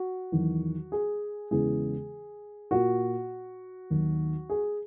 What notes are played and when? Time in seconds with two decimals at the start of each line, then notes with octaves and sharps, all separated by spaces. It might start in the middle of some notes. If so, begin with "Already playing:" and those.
Already playing: F#4
0.32 E2 D#3 F#3
0.92 G#4
1.51 E2 C#3 E3 G#3 B3 G#4
2.71 A#2 A#3 F#4
3.90 D#2 D#3 F#3
4.50 G#4